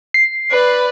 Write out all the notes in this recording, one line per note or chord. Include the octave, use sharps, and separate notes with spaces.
C7
B4 D5